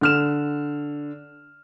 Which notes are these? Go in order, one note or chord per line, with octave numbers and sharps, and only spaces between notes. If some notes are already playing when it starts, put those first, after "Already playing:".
D3 F6 E7